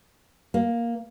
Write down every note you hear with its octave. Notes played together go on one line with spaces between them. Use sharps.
A#3